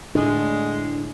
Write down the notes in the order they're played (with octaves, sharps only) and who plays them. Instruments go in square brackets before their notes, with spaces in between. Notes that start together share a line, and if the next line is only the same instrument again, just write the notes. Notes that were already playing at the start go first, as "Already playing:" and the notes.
[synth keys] A2 D3 [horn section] G#3 [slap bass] D4